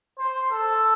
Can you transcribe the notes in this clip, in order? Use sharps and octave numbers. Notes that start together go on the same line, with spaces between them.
C5
A4